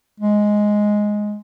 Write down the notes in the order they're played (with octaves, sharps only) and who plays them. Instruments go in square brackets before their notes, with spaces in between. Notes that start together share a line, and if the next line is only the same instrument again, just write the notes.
[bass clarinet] G#3